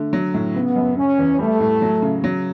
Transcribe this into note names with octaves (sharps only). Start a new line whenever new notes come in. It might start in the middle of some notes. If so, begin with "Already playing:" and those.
Already playing: D3 A3
F#3
A2
C#3 B3
F#2
C#3 C#4
E2
G3 A3
A2
F#3
C#3
F#3